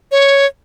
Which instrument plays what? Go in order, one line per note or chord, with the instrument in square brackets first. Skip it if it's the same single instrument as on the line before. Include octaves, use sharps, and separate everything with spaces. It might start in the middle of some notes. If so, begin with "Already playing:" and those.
[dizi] C#5